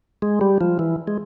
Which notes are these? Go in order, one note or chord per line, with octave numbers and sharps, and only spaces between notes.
G#3
G3
F3
E3
G#3